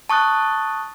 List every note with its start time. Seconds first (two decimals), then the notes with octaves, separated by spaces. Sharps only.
0.09 A5 C#6 D#6 F#6 A6